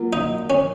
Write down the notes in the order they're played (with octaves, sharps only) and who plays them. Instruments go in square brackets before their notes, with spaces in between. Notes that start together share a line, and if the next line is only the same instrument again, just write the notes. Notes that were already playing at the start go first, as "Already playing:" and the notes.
Already playing: [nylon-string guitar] F#3 A#3 F4
[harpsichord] D#4
C#4